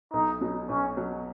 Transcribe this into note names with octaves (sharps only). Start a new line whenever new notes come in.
B1 D#4
B2 F#3
B1 C#4
B2 F#3